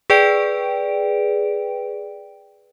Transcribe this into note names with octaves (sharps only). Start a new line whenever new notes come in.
G#4 B4 D5 G5 D7